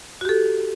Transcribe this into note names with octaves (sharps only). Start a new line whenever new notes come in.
F#4 G4 A4